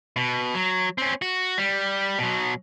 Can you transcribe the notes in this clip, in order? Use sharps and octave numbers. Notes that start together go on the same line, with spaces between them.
B2
F#3
C4 C#4
F#4
G3
B2 F#3